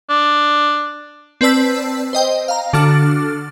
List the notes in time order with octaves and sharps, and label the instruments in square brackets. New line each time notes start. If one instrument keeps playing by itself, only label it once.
[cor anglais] D4
[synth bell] C4 B4 D5 A5 E6 B6
C5 D#5 G5
F5 A#5
D3 D4 F#4 A4 F6 A6